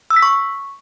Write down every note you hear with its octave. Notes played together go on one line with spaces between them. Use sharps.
E6
B6
C#6